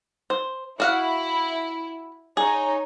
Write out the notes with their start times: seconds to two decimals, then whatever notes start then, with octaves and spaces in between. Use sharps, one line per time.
0.30 C5
0.80 E4 F#4 F5 F#5
2.37 D#4 G#4 C#5